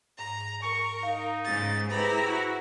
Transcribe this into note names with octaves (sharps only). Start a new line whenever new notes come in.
G#2 A#5
A#4 C#6
D#4 F5
G#2 C#3 A6
E4 G4 G#4 B4 C5 A#5 B5
F#4